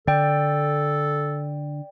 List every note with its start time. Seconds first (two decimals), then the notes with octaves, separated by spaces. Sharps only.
0.08 D3 A4 D5 G5